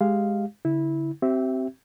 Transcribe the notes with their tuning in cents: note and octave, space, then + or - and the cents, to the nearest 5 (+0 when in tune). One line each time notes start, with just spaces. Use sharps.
G#3 +0 G4 +0 F5 +0
D3 -40 E4 -15
C4 +0 G4 -35 E5 +0